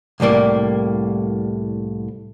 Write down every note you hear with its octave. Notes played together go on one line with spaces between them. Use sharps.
C2 A2 G3 A#3